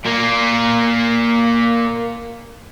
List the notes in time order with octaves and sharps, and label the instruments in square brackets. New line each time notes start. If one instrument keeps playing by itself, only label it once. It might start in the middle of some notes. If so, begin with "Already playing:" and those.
[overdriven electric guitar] A#2 A#3